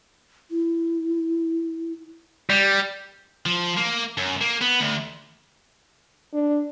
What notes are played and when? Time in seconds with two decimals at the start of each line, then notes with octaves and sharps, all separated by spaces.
0.51 E4
2.50 G3
3.46 F3
3.77 A#3
4.18 F#2
4.41 A#3
4.62 B3
4.81 D2
6.33 D4